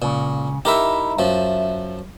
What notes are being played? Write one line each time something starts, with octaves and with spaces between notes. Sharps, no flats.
C#2 A#2 C#3
D#4 E4 G4 A#4 E5
F#2 F3 E5